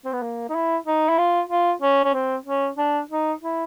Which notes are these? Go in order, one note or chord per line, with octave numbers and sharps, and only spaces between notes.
C4
B3
A#3
D#4
E4
D#4
E4
F4
F4
C#4
C#4
C4
C#4
D4
D#4
E4